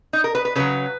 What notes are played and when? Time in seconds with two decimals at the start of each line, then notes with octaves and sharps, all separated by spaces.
0.13 D#4
0.24 A#4
0.35 B4
0.45 B4
0.55 C#3 F#3 B4